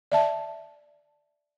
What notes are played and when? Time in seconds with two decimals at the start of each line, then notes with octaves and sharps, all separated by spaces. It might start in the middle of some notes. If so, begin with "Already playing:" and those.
0.12 D5 E5 A5